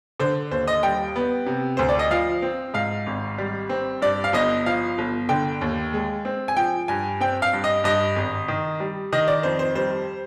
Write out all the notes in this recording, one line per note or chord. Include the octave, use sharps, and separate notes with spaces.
D3 C5
D#2 C5
D#5
G3 G5
B3
C3
D2 C5
D5
D#5
F3 F5
C4
G#2 F5
G#1
G3
C4
G2 D5
F5
G1 D#5
F3 F5
G1
D3 G5
D#2
G#3
C4
G#5
F3 G5
G2 G#5
C4 G5
F5
G2
D#5
G2 D#5
G#1
D#3
G3
D#3 D#5
D5
F2 C5
C5
G3 C5